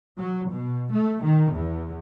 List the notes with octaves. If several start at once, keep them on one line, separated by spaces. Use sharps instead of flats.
F#3
B2
A3
D#3
E2